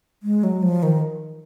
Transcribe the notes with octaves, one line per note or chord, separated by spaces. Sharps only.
G#3
F#3
F3
D#3